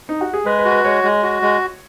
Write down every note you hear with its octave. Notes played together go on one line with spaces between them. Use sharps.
D#4
F#4
G#4
G#3 B4
B4
F#4
B4
G#3 C#5
G#3
F#4
G#3